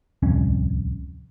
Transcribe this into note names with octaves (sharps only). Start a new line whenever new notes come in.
D1 C2 F2 C#4